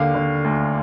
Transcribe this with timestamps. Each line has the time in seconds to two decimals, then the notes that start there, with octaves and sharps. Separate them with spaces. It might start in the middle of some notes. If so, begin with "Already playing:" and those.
Already playing: D#2 D3 F5
0.15 D3
0.44 D2